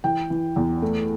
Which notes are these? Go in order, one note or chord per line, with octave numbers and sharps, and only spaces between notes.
E3 G5
E3
E2
A3